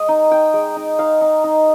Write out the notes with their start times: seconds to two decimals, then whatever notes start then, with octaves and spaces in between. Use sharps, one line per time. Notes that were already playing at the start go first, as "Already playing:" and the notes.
Already playing: G#3 D#5
0.08 D#4
0.31 D#4 G5
0.54 G#3
0.76 D#4
0.99 D#4 F5
1.21 D#4
1.44 D#4